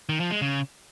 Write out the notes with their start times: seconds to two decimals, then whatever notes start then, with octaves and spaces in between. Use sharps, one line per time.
0.09 D#3
0.20 F3
0.31 G#3
0.42 C#3